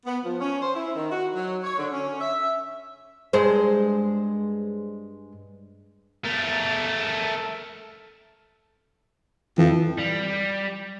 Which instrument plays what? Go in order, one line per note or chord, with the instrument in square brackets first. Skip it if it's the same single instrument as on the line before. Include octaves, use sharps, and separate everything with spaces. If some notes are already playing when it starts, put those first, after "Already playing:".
[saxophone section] B3
F3
C#4
C5
E4
D#3
F#4
F#3
C#5
D3
C#4
E5
[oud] G2 G#3 C5
[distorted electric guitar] A3 A#4
[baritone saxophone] F2 [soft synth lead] E3
[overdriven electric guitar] G3